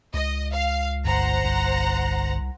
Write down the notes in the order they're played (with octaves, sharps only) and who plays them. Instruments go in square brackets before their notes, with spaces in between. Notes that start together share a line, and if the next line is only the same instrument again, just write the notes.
[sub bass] C#2 [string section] D#5
[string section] F5
[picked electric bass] G1 [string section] C5 F#5 A#5
[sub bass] C2